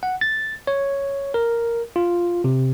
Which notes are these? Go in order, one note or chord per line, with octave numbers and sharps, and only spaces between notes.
F#5
A6
C#5
A#4
F4
C3